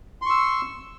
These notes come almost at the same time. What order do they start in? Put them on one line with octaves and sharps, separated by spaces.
C6 C#6 E6